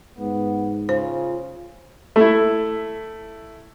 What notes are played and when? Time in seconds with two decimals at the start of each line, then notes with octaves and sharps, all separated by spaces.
0.19 G#2 B3
0.89 C#3 F4 C5
2.16 A3 E4